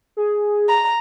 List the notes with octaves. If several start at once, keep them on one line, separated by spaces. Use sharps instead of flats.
G#4
A#5